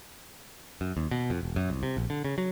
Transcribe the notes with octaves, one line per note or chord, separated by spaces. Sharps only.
F#2
D#2
B2
F2
E1
F#2
C2
C3
A#1
D3
C#3
F#3